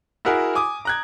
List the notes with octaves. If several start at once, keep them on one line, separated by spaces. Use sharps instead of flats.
E4 F#4 G#4 A#4 F#5
G#5 D6 D#6
A#5 F#6 G#6